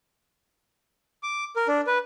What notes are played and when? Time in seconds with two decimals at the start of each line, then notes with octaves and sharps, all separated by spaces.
1.23 D6
1.56 A#4
1.68 D4
1.87 B4